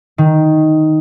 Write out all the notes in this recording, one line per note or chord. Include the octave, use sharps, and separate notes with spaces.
D#3